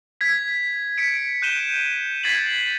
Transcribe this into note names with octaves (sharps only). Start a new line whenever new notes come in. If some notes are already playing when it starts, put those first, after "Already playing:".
G#6 B6
B6 C#7 D7
F#6 G6 D#7 E7 G7
G#6 A6 B6 C7 F#7